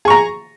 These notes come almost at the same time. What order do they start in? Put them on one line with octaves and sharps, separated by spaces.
G#4 C#6 A#5